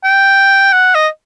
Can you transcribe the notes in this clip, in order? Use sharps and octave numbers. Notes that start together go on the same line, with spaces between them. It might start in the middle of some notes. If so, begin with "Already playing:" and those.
G5
F#5
D#5